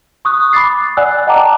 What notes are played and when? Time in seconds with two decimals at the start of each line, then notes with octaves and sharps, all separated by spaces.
0.25 C#6 D#6 F#6
0.53 B5 D6 D#6 A6 C7
0.97 D5 F#5 G#5 E6 F#6
1.27 D#5 F#5 G5 A5 A#5 D6